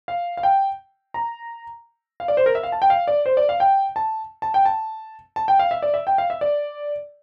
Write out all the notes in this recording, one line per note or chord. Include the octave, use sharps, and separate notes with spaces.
F5
F5
G5
A#5
F5
D5
C5
A#4
E5
F5
A5
G5
F5
D5
C5
D5
F5
G5
A5
A5
G5
A5
A5
G5
F5
E5
D5
E5
G5
F5
E5
D5